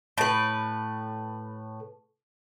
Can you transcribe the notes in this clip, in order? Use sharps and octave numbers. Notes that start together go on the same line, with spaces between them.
A2 B4